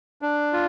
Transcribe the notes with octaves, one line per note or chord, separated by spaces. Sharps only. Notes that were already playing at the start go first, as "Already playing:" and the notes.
D4
F4